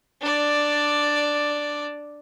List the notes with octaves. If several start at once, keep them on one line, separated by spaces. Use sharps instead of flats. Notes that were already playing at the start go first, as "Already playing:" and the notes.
D4 D5